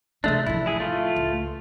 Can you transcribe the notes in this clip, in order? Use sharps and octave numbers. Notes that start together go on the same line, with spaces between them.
C3 E3 G#3 A3 D4
A1 F3 E4
E4 G#4
A3 F4
C#2